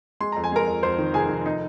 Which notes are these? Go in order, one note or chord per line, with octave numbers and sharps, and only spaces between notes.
G#3 C6
F2 A#5
G#5
G#3 A#4 A#5
F2
F2 C5 C6
D#3
F1 G#4 G#5
F1
D#4